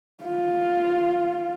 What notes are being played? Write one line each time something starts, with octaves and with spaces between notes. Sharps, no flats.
F4